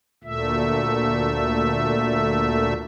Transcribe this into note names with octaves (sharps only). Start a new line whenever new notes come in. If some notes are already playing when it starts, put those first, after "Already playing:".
D2 A#2 A3 E5